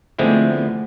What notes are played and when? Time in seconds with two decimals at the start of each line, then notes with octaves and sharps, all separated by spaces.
0.19 D3 F3 G#3 A3 B3 C4 E4
0.49 A3 B3